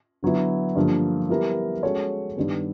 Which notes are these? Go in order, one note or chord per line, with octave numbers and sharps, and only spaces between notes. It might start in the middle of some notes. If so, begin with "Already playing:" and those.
D3 F#3 B3 E4
G2 D3 F3 A#3
G3 B3 E4 G4 A#4
G#3 C#4 F#4 A4 C#5
G2 D#3 G3 B3